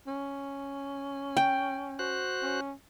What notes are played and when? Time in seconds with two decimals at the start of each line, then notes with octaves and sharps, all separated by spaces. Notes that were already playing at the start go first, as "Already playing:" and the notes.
0.07 C#4
1.37 G5
1.99 F#4 C5 F#6
2.43 C#4